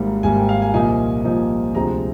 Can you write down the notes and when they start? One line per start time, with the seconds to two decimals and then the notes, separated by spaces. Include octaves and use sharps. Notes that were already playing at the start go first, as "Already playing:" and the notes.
Already playing: G#1 G#2 G3 A#3
0.23 G#1 G#2 G3 A#3 G#5
0.36 G5
0.49 F5
0.62 G#5
0.74 C2 A#2 F3 A#3 D#4 G#5
1.25 C2 A#2 F3 A#3 D#4
1.75 D2 C3 F3 G#3 C4 A#5